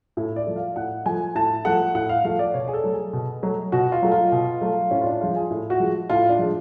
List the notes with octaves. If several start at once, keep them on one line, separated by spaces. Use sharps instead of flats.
A2
D5
F3 A3
F5
A2 F#5
F3 A3 G#5
A2 A5
F3 A3 F#5
A2 F#5
F5
F3 A3 F5
D5
B2 C#5
G#4
A4
F#3 A3
G#4
B2
F#3 A3
B2 F#4
F4
F#3 A3
F4
B2
F#3 A3
A2 C#4
F4
D4
F3 G#3 F4
G#4
A2
F#4
F3 G#3
A2 F4
D4
F3 G#3